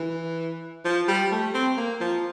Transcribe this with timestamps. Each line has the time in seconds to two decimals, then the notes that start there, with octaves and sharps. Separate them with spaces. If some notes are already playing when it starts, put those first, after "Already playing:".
Already playing: E3
0.85 F3
1.08 G3
1.32 A3
1.54 C4
1.78 A#3
2.01 F3